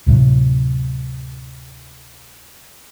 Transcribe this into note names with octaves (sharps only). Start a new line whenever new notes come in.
D2 A2 C3 F#3